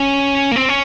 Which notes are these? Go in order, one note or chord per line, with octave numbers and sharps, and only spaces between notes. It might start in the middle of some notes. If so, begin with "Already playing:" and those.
Already playing: C#4
A#3
C4
C#4